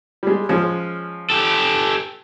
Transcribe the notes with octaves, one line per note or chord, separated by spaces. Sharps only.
G3 G#3
F3 G#3 C#4
G4 A4